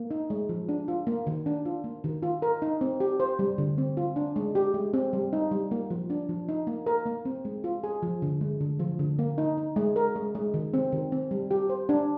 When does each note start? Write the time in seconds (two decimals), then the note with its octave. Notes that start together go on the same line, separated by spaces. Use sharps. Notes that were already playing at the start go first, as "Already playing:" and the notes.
Already playing: A#3
0.11 D#4
0.30 G#3
0.49 F3
0.69 D4
0.88 F4
1.07 A#3
1.27 D#3
1.46 D4
1.66 F4
1.84 A#3
2.04 D#3
2.23 F4
2.42 A#4
2.62 D#4
2.81 C4
3.00 G4
3.20 C5
3.39 G3
3.58 D3
3.78 C4
3.97 F4
4.16 D4
4.36 G#3
4.55 G4
4.74 G#3
4.93 C4
5.13 G3
5.33 D#4
5.51 G3
5.71 A#3
5.90 F3
6.10 D4
6.29 F3
6.49 D#4
6.67 A#3
6.87 A#4
7.06 A#3
7.25 C4
7.45 G#3
7.64 F4
7.84 G#4
8.03 F3
8.22 D3
8.41 G#3
8.61 D3
8.79 F3
8.99 D3
9.19 A#3
9.38 D#4
9.58 D#4
9.76 G#3
9.96 A#4
10.16 G#3
10.35 G#3
10.54 D#3
10.74 C4
10.92 D#3
11.12 C4
11.31 G3
11.51 G4
11.69 C5
11.89 D4